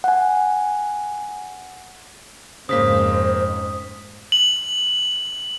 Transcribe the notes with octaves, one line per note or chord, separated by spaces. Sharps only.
F#5 G#5
F2 G#2 C#3 A#3 C5 D#6 B6
F#7